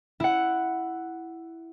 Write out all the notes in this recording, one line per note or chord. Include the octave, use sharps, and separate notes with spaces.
E4 F#5